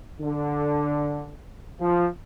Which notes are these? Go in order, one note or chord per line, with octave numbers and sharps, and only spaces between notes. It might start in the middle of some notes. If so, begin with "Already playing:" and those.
D3
F3